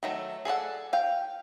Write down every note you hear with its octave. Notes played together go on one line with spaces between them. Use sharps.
D#3 F#3 A3
G#4 A4 D5 F#5
F5 G5